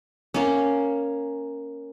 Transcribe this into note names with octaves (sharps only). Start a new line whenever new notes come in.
A#3 C#4